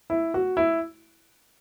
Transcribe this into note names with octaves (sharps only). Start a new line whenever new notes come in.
E4
F#4
E4